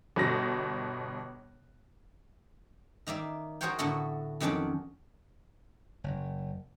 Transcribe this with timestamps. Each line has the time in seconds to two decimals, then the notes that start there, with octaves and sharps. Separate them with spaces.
0.16 G1 B2 A#6
3.07 D#3 A#3 D5 E5
3.61 F#4 G#4 A#4 C5 C#5 G5
3.79 A2 D3 A3 B3 F#4 A4
4.40 F2 D#3 F#3 C#4 D4 D5
6.04 F#1